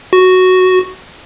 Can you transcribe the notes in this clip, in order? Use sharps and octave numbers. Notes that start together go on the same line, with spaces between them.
F#4